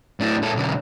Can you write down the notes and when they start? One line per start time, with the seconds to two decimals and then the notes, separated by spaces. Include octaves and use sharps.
0.20 A2 D4
0.42 A#2 A4
0.55 B1 D3